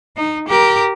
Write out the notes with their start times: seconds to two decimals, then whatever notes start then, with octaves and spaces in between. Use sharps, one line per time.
0.17 D#4
0.49 G4 A#4